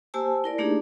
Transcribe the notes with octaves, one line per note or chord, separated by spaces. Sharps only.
A#3 G4 C5 G#5 A5 E6
E4 A#4 D5
A3 A#3 D4 D#4 G4 G#4